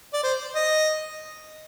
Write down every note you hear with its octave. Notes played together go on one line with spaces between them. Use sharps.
D5
C5
D#5